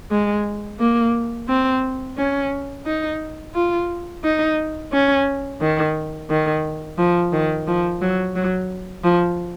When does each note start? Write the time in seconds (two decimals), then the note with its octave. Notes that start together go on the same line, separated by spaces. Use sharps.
0.11 G#3
0.80 A#3
1.49 C4
2.18 C#4
2.86 D#4
3.54 F4
4.24 D#4
4.92 C#4
5.61 D#3
6.30 D#3
6.98 F3
7.33 D#3
7.67 F3
8.02 F#3
8.36 F#3
9.04 F3